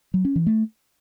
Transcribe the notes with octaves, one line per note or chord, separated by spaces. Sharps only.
F#3
C#4
E3
A3